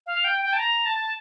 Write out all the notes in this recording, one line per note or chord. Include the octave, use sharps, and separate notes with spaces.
F5
G5
G5
A5
A#5
A5